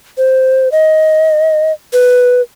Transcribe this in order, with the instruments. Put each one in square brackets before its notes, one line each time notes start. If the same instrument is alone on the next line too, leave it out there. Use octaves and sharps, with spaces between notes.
[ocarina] C5
D#5
B4